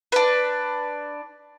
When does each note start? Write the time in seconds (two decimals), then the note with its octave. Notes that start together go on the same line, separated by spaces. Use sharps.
0.12 D4 B4